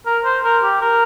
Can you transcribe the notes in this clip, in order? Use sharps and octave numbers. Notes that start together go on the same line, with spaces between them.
A#4
C5
A#4
G4
A#4